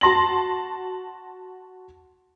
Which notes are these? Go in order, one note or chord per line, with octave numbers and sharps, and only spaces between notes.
F#4 A5 C6 A#6 F#7